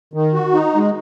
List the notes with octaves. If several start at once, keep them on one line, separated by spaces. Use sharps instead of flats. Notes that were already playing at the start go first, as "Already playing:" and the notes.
D#3
F#4
D#4
G#3